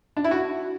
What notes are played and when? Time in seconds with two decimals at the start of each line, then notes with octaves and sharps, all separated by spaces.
0.17 D4
0.24 E4
0.31 F#4